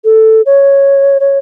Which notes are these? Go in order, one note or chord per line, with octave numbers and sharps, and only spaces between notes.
A4
C#5
C#5